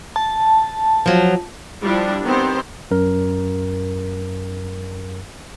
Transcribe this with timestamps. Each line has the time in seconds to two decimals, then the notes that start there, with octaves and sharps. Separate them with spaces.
0.16 A5
1.06 F3 F#3
1.83 F3 G3 D4 E4
2.24 D#3 B3 C4 G4 C5
2.91 F#2 A#4